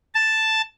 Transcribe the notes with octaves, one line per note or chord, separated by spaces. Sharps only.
A5